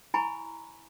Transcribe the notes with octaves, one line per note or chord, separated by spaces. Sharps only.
E4 G#5 A#5 B5 C#6